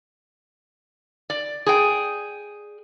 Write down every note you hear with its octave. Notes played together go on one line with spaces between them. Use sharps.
D5
G#4 G5